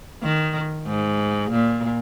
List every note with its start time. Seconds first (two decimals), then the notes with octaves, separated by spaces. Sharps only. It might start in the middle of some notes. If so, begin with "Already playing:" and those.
0.22 D#3
0.86 G#2
1.52 A#2